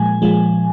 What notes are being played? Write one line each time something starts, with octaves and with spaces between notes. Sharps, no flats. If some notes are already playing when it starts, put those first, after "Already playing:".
Already playing: A#2 F3 G#3 G#5
A#2 F3 G#3